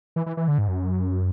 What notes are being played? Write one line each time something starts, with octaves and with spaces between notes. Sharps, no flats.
E3
E3
E3
D3
G#2
F#2